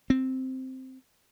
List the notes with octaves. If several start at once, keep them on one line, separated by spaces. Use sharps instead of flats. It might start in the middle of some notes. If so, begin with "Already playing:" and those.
C4